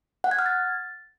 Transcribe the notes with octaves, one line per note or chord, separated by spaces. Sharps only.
F#5
G#6
F6
A6